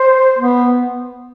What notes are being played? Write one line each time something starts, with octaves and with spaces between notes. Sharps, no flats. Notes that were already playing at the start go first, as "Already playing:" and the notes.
Already playing: C5
B3